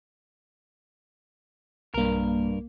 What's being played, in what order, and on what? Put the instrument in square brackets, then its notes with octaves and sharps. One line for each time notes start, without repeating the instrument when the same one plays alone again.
[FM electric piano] B1 A#3 [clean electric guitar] G2 A#4